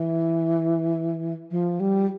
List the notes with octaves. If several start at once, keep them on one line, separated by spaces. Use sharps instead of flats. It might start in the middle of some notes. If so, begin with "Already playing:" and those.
Already playing: E3
F3
G3